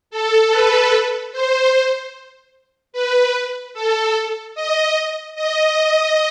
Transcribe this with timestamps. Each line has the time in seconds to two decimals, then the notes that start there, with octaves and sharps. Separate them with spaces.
0.11 A4
0.51 B4
1.32 C5
2.93 B4
3.74 A4
4.55 D#5
5.35 D#5